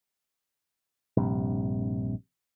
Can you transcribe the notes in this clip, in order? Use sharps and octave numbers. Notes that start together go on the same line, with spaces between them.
A#1 G2 C3